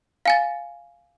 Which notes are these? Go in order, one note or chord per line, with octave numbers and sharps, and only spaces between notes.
F5 G#5 A6